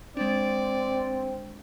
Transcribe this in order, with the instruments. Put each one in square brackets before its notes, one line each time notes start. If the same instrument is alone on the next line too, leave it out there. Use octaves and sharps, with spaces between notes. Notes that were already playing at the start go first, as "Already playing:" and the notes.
[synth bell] G#3 D4 [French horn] C4 [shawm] D5